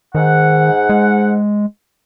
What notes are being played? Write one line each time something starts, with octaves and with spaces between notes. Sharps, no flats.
G#2 D#3 F#5
G#3